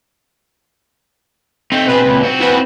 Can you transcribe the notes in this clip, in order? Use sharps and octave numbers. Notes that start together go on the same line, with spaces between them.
A3 C4 D#4
B2 G#4 B4
C#2 A#2
C4 F#4
E4 B4 F#5 G#5